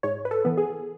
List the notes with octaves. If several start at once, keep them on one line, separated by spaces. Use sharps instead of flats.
G#2 C#5
B4
A4
E3 B3
G#4